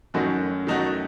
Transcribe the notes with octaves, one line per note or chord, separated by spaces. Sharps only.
F#2 D#3 A3 D#4 F#4
D#3 A3 D#4 F#4